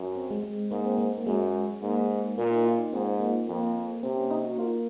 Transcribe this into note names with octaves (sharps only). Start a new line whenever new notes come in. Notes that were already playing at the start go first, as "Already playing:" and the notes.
Already playing: F#2
C4
G#3
G#3
G#2 A#3
C4
A#3
A#3
F#2 G#3
G#2 A#3
A#2 A#3
D#4
F4
D#4
G#2 C4
A#3
F2 A#3
C3 C4
C#4
D#4
F#4
A#3 F4